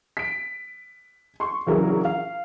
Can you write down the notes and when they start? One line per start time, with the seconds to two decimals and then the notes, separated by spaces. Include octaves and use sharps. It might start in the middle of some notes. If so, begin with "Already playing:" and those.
0.17 B6 D7
1.40 C6 C#6
1.66 A#1 C#3 E3 F#3 E4 A#4
2.05 F5